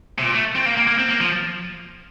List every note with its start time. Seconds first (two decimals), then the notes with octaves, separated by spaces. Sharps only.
0.18 C3
0.22 A#2
0.34 A3
0.55 C4
0.66 A#3
0.77 A#3
0.87 A#3
0.99 C4
1.09 A#3
1.20 F3